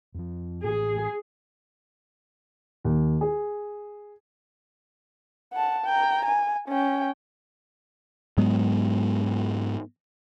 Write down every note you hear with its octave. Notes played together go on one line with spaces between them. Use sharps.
F2 F3
A2 E3 G#4
D#2
G#4
F#5 A5
G5 A#5
G#5
C#4 G5
G#2 F#3 G#3 B3